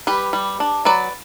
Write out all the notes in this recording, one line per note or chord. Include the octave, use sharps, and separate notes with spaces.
G3 G4 B4
G3
D4
F#3 B4 D5